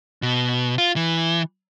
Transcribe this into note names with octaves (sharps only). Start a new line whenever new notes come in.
B2
F4
E3